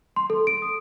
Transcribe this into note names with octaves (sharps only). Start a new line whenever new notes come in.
C6
A4
D7
D#6